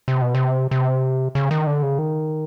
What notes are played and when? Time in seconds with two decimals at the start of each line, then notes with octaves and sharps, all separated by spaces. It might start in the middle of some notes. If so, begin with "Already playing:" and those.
0.08 C3
0.22 B2
0.35 C3
0.71 C3
1.35 C#3
1.51 D#3
1.67 D3
1.82 C#3
1.98 D#3